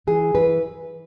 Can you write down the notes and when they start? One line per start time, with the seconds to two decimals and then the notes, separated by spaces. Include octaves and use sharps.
0.07 E3 G#4
0.35 E3 B4